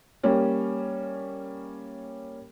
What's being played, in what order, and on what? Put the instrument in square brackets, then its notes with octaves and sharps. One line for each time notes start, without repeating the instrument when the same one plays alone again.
[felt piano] G3 A#3 C#4